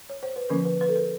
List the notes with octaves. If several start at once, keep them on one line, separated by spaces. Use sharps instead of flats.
C#5
C5
B4
D3 F3 A#3 C#4 A#4
B4
B4
A4
A#4